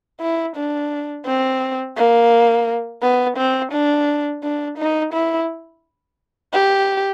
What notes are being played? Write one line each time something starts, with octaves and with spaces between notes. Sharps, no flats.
E4
D4
C4
A#3
B3
C4
D4
D4
D#4
E4
G4